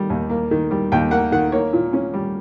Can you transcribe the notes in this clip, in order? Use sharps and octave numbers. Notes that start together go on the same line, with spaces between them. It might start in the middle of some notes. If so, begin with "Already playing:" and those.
Already playing: D#3 G3
D#2
A#3
D#3
G3
D#2 G5
A#3 F#5
D#3 F#5
A#3 C#5
A#2
C#4
G3